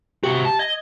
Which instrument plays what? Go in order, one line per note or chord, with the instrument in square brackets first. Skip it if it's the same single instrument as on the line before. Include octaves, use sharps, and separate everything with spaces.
[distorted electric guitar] C3 F#4 [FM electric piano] G4
[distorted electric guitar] A5
[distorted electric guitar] D#5 [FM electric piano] G#6